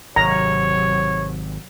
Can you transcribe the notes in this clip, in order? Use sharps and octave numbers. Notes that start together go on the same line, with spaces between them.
G#1 C3 F#3 C#5 A#5